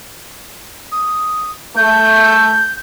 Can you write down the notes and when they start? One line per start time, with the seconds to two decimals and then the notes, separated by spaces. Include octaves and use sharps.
0.92 D#6
1.76 A3 G6